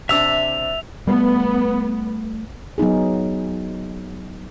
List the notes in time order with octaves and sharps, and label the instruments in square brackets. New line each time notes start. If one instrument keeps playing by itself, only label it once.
[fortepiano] C3 D4 [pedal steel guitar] E5 E6 [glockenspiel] F7
[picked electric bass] G3 A3 [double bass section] B3
[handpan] F#3 B3 D#4 G#4